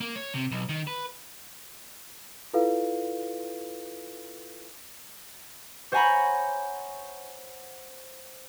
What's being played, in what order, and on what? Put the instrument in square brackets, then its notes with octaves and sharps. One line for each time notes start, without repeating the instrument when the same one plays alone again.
[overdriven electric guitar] A#3
C#5
C3
B1
D#3
B4
[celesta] E4 F4 A4 B4 F5
[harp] C5 C#5 F#5 G#5 A#5 B5